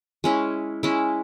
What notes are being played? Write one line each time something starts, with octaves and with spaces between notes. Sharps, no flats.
G#3 C#4 E4
G#3 C#4 E4